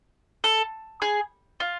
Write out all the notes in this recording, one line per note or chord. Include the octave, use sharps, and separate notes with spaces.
A4
G#4
F4